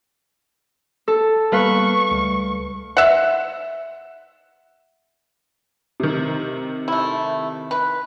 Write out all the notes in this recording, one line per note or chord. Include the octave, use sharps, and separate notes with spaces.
A4
G3 A#3 B3 B4 F5 C#6
C#2 G3 A3
E5 F#5
C3 D#3
A3 E4
B4